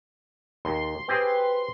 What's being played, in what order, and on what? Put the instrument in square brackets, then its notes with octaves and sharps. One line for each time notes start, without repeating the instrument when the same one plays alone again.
[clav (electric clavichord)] D#2 [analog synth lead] C6
[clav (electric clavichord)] C4 G4 G#4 [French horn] B4